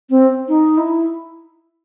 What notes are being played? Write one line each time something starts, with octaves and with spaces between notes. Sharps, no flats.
C4
D#4
E4